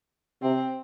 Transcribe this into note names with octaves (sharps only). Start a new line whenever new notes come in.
C3 C4